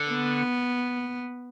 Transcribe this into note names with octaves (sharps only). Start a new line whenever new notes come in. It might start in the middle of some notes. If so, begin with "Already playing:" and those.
Already playing: D3
B3